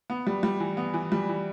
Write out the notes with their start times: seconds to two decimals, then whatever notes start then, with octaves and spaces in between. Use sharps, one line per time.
0.10 B3
0.27 G3
0.43 G3
0.60 E3
0.77 B3
0.94 E3
1.12 G3
1.29 E3